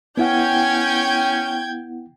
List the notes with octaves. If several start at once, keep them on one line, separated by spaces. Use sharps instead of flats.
B3 C#4 E4 F#5 G5 G6 G#6